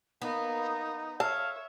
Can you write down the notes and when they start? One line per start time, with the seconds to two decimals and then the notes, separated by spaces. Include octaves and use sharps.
0.22 A#3 B3 D#4
1.20 A4 C#5 E5 F5 A5